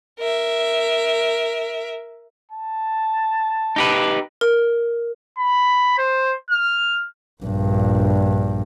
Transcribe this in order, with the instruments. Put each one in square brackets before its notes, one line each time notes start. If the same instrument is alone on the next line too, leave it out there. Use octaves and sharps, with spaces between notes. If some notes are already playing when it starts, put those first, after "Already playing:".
[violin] A#4 E5
[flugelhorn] A5
[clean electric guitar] D#4 G4 B4
[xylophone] A#4
[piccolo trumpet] B5
C5
F6
[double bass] A#1 G2